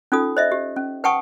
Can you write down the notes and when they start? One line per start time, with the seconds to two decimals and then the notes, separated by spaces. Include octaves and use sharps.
0.12 C#4 D#4 F4 A4 D#6
0.37 C5 D#5 E5
0.52 G4
0.76 C#4
1.04 B4 F#5 G5 A5 C#6 D#6